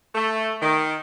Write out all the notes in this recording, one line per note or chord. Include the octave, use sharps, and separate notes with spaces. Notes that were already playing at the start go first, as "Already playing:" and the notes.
A3
D#3